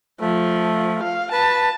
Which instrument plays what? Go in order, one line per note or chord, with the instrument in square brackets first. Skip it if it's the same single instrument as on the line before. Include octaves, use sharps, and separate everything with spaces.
[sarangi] F3 [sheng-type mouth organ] A3
[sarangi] F5
[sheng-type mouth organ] B4 [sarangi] A5